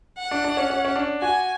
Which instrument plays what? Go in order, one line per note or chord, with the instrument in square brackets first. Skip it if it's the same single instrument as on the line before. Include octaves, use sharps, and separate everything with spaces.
[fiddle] F#5
[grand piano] D4
D4
C#4
C#4
C#4
D4
[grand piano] F#4 [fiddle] G#5